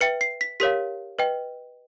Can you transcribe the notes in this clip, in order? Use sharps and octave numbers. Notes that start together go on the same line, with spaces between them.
B4 E5 G5 C#7
C7
B6
G4 A#4 C#5 F5 B6
B4 D#5 G5